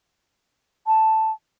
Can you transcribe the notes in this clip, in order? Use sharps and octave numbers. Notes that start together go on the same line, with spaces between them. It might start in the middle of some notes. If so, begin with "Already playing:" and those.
A5